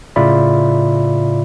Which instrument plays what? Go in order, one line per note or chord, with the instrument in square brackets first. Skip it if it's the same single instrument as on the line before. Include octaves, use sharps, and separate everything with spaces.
[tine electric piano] A2 C#3 F4 D5 E5 B5